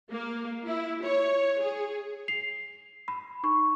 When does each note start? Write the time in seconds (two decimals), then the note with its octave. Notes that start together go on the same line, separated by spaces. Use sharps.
0.11 A#3
0.66 E4
1.03 C#5
1.61 G#4
2.28 C7 F7
3.08 B5
3.43 D#4 C#6